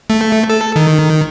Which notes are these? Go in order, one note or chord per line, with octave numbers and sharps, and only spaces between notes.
A3
A4
D#3